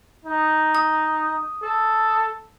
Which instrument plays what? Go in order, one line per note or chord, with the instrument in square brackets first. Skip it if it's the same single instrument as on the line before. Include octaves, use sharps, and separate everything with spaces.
[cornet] D#4
[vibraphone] D#6
[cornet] A4